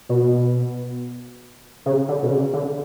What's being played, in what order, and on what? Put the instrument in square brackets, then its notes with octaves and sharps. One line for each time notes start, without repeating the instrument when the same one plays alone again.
[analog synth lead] B2
C#3
D3
B2
C#3
D3